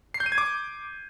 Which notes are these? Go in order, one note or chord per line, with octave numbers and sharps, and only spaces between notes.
C7
G6
D#7
G#6
D6